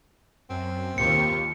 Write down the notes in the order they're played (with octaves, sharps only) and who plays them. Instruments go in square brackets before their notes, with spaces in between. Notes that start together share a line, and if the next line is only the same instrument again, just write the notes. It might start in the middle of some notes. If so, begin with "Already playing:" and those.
[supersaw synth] F#2 [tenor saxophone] C4
[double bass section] D#2 [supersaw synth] F4 G4 C#6 [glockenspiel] C#7